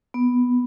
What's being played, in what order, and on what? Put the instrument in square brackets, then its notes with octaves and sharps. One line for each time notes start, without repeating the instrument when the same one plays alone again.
[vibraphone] B3